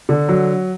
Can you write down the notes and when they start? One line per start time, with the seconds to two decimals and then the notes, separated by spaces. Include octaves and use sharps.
0.09 D3
0.29 F#3